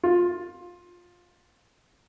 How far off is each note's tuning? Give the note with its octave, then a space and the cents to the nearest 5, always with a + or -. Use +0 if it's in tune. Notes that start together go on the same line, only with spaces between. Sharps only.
F4 +15